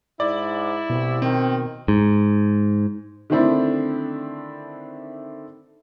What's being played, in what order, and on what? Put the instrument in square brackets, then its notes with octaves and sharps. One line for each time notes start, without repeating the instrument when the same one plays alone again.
[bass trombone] G#2 [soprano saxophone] E4 [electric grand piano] D5
[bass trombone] C2 [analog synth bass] B2
[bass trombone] D#3 [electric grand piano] C4
[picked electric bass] G#2
[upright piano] D3 D#3 A3 C4 D4 E4